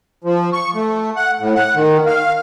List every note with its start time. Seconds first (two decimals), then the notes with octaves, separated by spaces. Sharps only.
0.24 F3
0.53 C#6
0.75 A3
1.16 F#5
1.40 A2
1.55 F#5
1.75 D#3
2.07 F5